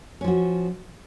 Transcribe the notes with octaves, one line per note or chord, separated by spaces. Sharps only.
F3 C#4 F#4